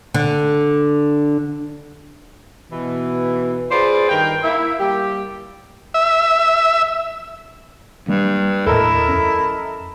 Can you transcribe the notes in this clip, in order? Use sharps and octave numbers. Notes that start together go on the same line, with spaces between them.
D3
B2 E3
F4 G#4 B4 C5 D5
G2 D#3 A#4 G5
A#3 E4
G3 A#3 G4
E5
G2 F#3 G3 A#3
D#2 A2 E4 A4 A#4 D#5
F2 C#4